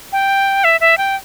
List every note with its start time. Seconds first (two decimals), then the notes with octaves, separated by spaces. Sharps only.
0.12 G5
0.64 E5
0.81 E5
0.98 G5